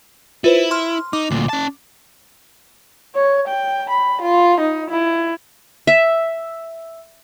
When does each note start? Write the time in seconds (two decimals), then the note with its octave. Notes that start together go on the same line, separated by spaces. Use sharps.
0.44 E4 F4 B4 C5
0.71 C6 F6
1.13 D#4 D6
1.31 D2 A#2
1.49 C#4 A5
3.15 C#5
3.48 G5
3.90 B5
4.22 F4
4.61 D#4
4.90 E4
5.87 E5